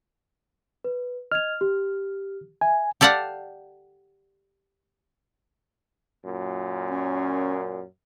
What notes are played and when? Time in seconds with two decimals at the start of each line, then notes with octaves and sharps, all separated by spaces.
0.84 B4
1.32 D#5 F6 G#6 F7
1.61 G4
2.61 E5 G#5
3.01 G4 A4 D5 F5 F#5
6.25 F#2 A#2
6.91 C#4